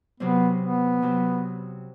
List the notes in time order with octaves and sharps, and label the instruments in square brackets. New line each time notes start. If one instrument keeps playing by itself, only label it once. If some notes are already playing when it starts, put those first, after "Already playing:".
[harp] C3 F#3 C4 [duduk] B3
[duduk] B3
[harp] C3 F#3 C4